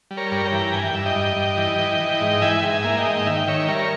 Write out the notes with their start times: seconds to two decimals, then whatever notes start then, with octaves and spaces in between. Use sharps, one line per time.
0.11 G3
0.17 A#4 C#5
0.31 G2
0.45 G5 A#5
0.52 E3
0.73 G2 G#5
0.84 G5
0.94 G2 E5
1.06 D#5 G5
1.16 G2
1.37 G2
1.57 E3
1.79 E3
2.00 E3
2.21 G#2
2.42 E3 E5 G#5
2.63 G#2
2.70 E5 G#5
2.84 A#3
2.98 D#5 G5
3.05 G#2
3.26 D#3 E5
3.37 G5
3.47 D#3 C#5 E5
3.68 G3 A#4 C#5